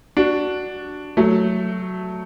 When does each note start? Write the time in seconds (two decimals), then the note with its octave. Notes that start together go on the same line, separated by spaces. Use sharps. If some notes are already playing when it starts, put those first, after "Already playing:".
0.17 D4 F#4
1.17 F#3 A3